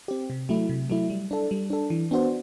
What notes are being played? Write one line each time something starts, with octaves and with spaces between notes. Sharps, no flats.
C4 G4
C3
F#3 A3 E4
C3
F#3 A3 E4
G3
D4 A4
G3
D4 A4
E3
B3 D4 F#4 C5